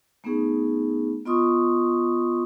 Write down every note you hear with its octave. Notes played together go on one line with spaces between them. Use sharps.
A3 B3 C#4 D#4 G#4
B3 F4 D#5 C6 C#6 D#6